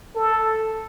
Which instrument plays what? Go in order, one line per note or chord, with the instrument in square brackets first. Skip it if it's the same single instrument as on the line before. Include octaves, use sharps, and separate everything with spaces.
[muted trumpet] A4